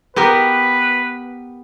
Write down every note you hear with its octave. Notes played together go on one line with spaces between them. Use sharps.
B3 G4 A#4 B4